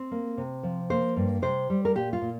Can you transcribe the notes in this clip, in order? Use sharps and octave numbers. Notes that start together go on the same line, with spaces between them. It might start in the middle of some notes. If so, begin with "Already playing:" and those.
Already playing: C4
A#3
C3
F3
A#3 C5
G2
C3 C5
G3
A#4
A#2 G4
F4
A#2